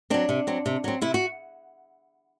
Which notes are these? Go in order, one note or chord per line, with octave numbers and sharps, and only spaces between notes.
F#3 C4 D4
C3
F#3 C4
C3
F#3 C4
C3 E4
F#4